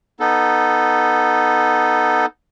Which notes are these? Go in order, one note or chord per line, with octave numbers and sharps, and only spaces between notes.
B3 D#4 A4